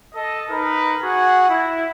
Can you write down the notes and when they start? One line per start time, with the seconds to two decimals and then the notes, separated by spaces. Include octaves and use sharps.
0.15 A4 D#5
0.50 D#4 A#4 B4
1.02 F#4 G#4 F#5
1.48 E4